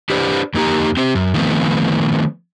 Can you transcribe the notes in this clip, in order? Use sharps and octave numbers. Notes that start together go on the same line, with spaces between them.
D4 G4 B4 C5 D5
F2 A#3 D#4 G4 A#5
C4 G4 C5
F#2
D#3 F3 A3 B3 C4